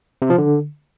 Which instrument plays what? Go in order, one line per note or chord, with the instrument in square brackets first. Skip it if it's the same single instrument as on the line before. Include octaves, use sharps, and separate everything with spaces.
[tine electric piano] C3
F3
D3